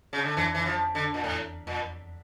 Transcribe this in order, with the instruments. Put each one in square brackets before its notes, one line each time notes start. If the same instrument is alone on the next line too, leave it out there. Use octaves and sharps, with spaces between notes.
[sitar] C#3
D3
[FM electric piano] F2 [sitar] E3
[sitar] E3
F3
D3
A#2
[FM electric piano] E2 [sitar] A2
[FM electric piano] F2 [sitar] A#2